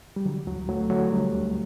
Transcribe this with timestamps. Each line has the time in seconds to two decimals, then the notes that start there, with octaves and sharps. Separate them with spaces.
0.16 G3
0.25 D3 F#3
0.47 D2 F#3
0.68 D2 F#3 A3
0.90 D3 F#3 A3
1.11 D3 G3
1.33 D2